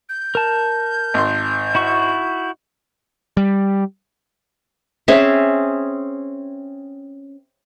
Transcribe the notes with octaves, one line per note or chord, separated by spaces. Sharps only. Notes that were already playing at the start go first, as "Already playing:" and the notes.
G6
A#4 A5
G#1 C6
E4 F#4 C#6
G3
C4 C#4 G#4 E5